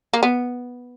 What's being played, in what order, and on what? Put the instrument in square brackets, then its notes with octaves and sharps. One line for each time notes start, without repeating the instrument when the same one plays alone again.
[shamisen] A#3
B3